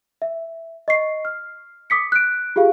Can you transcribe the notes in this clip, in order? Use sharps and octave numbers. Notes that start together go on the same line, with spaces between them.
E5
D#5 C#6 C7
F6
D6 D#6 B6 C#7
F#6 D7
F4 G4 G#4 F5